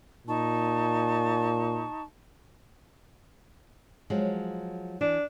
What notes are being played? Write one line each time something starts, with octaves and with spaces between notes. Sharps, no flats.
A#2 D#4 A5 C#6
F3 F#3 G#3
E3 D4